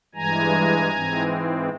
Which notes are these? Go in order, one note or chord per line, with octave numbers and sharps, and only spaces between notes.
G2 E3 G#3 G#5 A#5
G#2 E3 G#3 C4